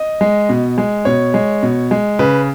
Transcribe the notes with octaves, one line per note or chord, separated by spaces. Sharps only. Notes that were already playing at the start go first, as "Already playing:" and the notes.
Already playing: D#5
G#3
B2
G#3
B2 C#5
G#3
B2
G#3
C#3 B4